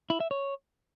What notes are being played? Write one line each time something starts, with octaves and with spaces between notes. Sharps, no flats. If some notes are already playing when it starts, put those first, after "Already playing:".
E4
E5
C#5